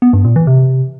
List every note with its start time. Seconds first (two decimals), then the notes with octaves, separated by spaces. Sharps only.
0.02 B3
0.13 G2
0.25 A#2
0.36 E3
0.47 C3